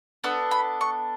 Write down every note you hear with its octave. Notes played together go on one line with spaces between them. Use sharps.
B3 D4 A4 E6
B5
C#6